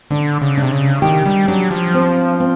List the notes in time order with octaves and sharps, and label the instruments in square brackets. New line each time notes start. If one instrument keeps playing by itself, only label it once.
[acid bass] D3 [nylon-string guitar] D4
[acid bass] C#3
[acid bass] C3 [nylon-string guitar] D4
[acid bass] C#3
[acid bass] D#3 [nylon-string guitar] G4
[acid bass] G3
[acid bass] F#3 [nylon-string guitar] D4
[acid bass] F3
[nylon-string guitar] C4
C4